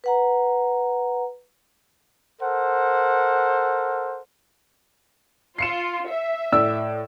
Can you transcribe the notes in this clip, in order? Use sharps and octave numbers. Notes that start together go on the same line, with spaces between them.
B4 F#5 A#5
A4 A#4 C5 F#5
F4 C7 C#7 E7
E5
A2 D5 E6